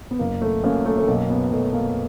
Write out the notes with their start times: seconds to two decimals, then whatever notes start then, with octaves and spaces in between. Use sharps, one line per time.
0.11 B3
0.19 F#1 A#3
0.42 A3
0.64 F#2 A#3
0.86 A3
0.97 A3
1.08 B1 A#3
1.29 B3
1.51 B1 A3
1.73 A#3